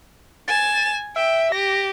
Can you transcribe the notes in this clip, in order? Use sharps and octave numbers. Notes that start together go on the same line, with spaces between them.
G#5 A6 E7
E5 G5
G4 A#6